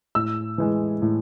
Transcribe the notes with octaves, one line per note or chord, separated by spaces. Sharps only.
A2 E6
E3 G#3
A2